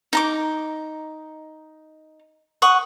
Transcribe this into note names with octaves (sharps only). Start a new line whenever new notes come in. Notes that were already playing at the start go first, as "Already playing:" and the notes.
D#4 A#5 D6
F#5 C#6 D#6